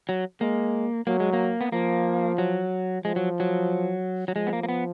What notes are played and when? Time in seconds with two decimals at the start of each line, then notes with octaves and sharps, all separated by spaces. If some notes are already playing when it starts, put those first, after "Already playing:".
0.09 F#3
0.41 G#3 A#3
1.07 F#3 A#3
1.20 G#3
1.33 A#3
1.61 B3
1.72 F3 A#3
2.38 F#3
3.04 F3 G#3
3.16 F#3
3.40 F#3
4.28 F#3
4.36 F3 G#3
4.47 B3
4.53 A#3
4.63 A#3
4.69 B3